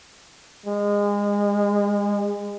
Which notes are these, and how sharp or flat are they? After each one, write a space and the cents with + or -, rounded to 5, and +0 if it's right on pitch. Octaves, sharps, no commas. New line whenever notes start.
G#3 -30